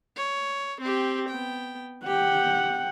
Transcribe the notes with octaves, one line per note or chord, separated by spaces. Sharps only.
C#5
C4 G4
B3 G5
G4 F#5 G5